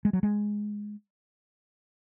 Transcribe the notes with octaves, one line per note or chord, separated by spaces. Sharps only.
G#3
F#3
G#3